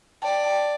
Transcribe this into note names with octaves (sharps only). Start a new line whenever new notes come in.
D5 G5 A5
G5 A5